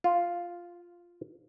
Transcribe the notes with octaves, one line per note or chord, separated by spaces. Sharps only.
F4